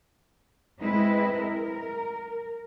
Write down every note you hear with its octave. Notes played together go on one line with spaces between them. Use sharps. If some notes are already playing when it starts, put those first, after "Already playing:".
G#3 C4 E4 B4 D#5
A#4